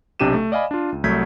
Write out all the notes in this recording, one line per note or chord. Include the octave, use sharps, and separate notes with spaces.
B1 C3 D4 G4 D#7 E7
A3
D5 D#5 F5 G#5 B5
D4 F4
C#2
C2 F#3 A3 G6 G#6 B6